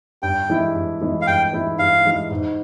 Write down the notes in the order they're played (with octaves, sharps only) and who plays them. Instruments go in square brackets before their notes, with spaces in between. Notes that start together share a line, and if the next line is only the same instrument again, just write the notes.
[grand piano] G2 [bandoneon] G5
[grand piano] E3 G#3 E4
G2
E3 G#3 E4
[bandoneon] F5
[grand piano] G2 [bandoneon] G5
[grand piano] E3 G#3 E4
[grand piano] G2 [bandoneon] F5
[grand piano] E3 G#3 E4
G#2